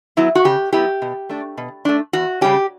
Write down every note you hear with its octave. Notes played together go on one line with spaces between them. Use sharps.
F#3 B3 E4
F#4
C#3 G4
F#3 B3 E4 G4
B2
A3 D4
B2
A3 D4
E2 F#4
C#3 G3 C#4 G4